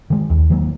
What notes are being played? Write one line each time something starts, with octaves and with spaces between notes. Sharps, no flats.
D#3 G#3
D#2
D#3 F#3 A#3